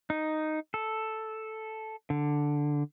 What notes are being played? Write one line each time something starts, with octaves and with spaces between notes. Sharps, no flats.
D#4
A4
D3